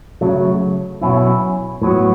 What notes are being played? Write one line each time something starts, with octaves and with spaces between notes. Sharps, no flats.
C#3 F#3 A3
B2 F#3 C#4 E4
A2 F#3 B3